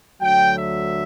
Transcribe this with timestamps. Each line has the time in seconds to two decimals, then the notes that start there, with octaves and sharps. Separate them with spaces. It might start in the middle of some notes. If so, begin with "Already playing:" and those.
0.21 D2 D3 F#3 G5
0.55 E5